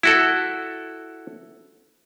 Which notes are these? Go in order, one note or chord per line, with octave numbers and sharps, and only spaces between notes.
E4 F#4 A4